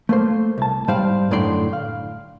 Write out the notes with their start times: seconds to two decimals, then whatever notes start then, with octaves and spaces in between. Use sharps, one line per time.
0.09 A3 A#3 C5
0.58 C2 A5
0.88 G#2 G3 C5 D5 F5
1.31 F#2 A2 D3 D5 C6
1.73 F5